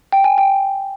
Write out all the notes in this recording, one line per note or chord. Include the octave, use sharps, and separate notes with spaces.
G5
G#5
G5